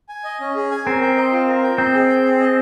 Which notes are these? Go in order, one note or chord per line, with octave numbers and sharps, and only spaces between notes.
G#5
D#5
C#4
G#4
G#5
C4 A#4
G5
D#5
F4
A#4
G5
C4 D#5
G#4
G5
G#4
D#5